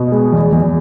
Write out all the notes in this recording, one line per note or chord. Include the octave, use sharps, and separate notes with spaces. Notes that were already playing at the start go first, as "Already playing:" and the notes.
Already playing: B2
G#3
E2
E2